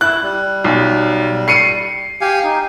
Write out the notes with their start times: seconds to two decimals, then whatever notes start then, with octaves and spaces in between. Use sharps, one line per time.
0.01 E4 F#6
0.23 G3
0.64 B1
1.48 C7 C#7 D#7
2.21 G4 F5 G#5
2.43 D#4